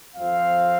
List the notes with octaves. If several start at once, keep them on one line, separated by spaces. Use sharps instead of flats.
F2 F3 C4 F5